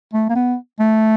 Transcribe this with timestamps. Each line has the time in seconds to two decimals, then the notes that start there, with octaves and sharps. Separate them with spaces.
0.14 A3
0.29 A#3
0.35 B3
0.80 A3